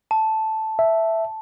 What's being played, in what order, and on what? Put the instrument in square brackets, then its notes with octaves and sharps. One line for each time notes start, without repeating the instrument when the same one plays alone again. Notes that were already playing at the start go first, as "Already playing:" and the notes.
[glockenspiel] A5
[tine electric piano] E5